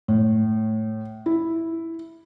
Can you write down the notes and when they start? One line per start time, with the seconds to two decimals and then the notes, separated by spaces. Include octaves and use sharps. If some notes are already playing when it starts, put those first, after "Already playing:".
0.08 A2
1.26 E4